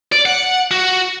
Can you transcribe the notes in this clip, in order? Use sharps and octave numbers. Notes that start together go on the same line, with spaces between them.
D5
F#5
F#4